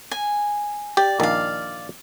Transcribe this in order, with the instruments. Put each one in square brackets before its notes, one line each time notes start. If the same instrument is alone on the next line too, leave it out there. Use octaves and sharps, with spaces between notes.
[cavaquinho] G#5
[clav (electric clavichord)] G4 [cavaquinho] D5
[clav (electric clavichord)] A#1 D#3 [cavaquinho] D5 F5